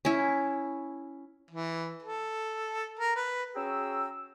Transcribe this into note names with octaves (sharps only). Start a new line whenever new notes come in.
C#4 E4
E3
A4
A#4
B4
C#4 F#4 G#4 G5 A#5 E6